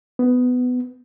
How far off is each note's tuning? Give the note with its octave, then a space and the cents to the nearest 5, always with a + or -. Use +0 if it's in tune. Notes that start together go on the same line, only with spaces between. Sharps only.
B3 +15